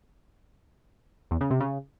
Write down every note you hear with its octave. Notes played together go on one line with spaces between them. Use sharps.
E2
C#3
C3
C#3